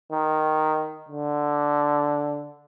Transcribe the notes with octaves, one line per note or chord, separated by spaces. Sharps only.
D#3
D3